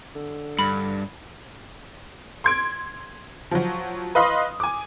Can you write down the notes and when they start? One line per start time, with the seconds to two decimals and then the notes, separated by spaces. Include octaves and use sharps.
0.15 D3
0.59 G2 B5
2.44 C6 G#6 D7
3.51 F3 F#3
4.15 B4 D#5 F5 B5 C6 D#6
4.60 G#5 D6